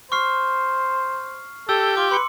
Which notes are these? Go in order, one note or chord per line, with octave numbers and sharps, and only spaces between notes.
C5 C#6 F6 C7
G4 A4 E6
F4 D6
B4 C6 C#7